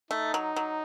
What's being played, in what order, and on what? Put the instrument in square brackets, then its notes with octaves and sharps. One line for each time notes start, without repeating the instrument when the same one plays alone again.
[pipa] A3 [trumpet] D#4
[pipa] F#3
F#3